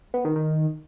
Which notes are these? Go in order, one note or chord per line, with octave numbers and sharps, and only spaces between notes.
B3
D#3
D#3